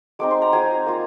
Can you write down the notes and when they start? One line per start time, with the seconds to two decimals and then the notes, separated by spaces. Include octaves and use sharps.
0.19 G#3 C4 D#4 D6
0.31 C6
0.42 A#5
0.53 G#3 C4 F4 G#5
0.86 A#3 F4